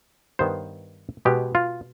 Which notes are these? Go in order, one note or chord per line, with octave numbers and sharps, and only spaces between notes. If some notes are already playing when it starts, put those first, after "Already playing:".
G2 D#3 B3 C5
B2 G#3 B3 G4
F4